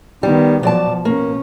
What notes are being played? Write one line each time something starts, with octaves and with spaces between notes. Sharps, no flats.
D#3 G3 B3
B2 F3 F#3 D5 A5
B2 A#3 C#4